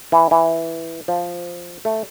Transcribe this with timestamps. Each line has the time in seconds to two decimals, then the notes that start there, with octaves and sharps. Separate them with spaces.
0.12 E3
0.31 E3
1.08 F3
1.85 A3